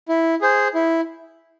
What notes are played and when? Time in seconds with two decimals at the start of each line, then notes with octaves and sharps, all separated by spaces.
0.09 E4
0.41 G#4 C5
0.74 E4